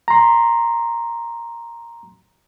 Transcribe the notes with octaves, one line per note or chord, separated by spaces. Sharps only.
A#5 C6